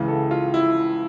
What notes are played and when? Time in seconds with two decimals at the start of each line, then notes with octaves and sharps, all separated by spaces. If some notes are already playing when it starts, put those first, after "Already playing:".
Already playing: C#2 C#3 E3
0.08 A4
0.31 F4
0.54 E4